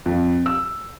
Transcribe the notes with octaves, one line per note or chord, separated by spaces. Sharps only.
F2
E6